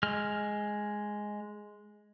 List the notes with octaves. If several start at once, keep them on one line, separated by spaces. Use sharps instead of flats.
G#3 F6